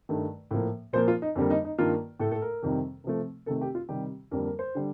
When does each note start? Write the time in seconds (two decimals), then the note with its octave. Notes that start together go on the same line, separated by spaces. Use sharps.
0.09 G2 D#3 A3
0.51 A2 F3 A#3
0.93 A#2 F3 A#3 C5
1.08 F4
1.22 D#4
1.36 F2 D3 G3 A#3
1.50 D#4
1.64 D#4
1.78 G2 D#3 A#3 F4
2.19 A2 A3 A4
2.31 A4
2.42 A#4
2.63 F2 C3 D#3 G3
3.04 C3 F3 A3
3.46 C3 D#3 A3 A4
3.61 G4
3.75 F4
3.89 C3 D#3 G3 G4
4.31 F2 D3 G3 A#3 A#4
4.45 A#4
4.59 C5
4.75 D3 G3